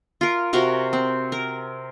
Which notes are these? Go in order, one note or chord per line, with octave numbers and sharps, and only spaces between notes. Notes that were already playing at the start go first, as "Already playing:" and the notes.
F4 A#4
C3 F#4 A#4 F5
C4
A#4